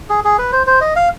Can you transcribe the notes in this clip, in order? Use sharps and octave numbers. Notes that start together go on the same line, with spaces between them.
G#4
G#4
B4
C5
C5
D#5
F5